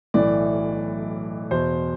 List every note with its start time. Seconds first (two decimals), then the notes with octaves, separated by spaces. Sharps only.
0.14 B1 A2 E3 D5
1.51 E2 B2 C5